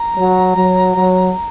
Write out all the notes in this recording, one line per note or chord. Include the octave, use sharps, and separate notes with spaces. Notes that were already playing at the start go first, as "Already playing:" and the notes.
Already playing: A#5
F#3
F#3
F#3